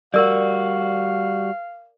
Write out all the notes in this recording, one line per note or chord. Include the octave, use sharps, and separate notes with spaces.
G3 F#4 A#4 D5 F5